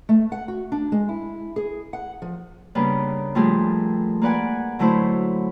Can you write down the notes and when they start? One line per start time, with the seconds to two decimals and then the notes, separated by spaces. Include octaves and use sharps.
0.09 A3
0.32 F#5
0.48 F#4
0.72 D4
0.92 G#3
1.09 E4
1.56 G#4
1.93 F#5
2.22 F3
2.75 C#3 G3 A#3 B3 D4 B4
3.35 A#2 F3 G3 A3 G4 G#4
4.22 A#3 B4 D5 F#5 G#5
4.79 D3 F#3 A3 E4 C5